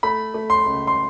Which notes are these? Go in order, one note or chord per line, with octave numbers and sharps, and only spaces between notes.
A3 B5
A3
C6
C#2
C6